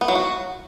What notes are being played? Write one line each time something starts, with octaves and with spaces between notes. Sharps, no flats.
B3
F#3
F#4